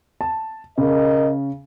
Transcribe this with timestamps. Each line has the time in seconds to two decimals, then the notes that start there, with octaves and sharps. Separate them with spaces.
0.21 A5
0.78 C#3 A#4 D#5